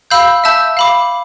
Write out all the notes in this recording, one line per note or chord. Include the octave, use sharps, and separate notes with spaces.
F5 B5 E6 G6
E5 A5 E6 G6
F5 B5 D6